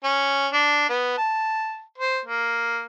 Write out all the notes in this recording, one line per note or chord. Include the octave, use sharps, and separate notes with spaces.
C#4
D4
B3
A5
C5
A#3